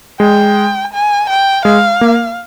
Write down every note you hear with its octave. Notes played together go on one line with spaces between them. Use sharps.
G#3 G5
G#5
G5
G#3 F5
A#3